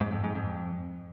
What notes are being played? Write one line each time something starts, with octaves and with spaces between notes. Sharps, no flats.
G#2
F2
G#2
F2